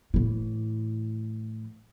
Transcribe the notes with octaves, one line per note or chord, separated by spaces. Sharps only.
A2 E3